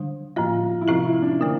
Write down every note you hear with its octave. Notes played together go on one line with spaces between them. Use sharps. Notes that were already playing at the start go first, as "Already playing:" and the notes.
Already playing: D3 G3 D4
A2 F3 A#3 F4
E4
C3 F3 C4 F4 G4
E4
D4
D3 A3 A#3